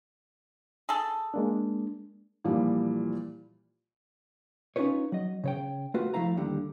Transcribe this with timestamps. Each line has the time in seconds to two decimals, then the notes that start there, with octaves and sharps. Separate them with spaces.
0.89 G#4 A4
1.34 G#3 A#3 D4
2.44 A#2 E3 F3 G3
4.76 C#4 D#4 F4 B4 C#5
5.12 F#3 D#5
5.44 C#3 C#5 G5
5.94 A3 F4 F#4 B4
6.14 F3 A3 E4 F5 A#5
6.37 D#2 D3 G3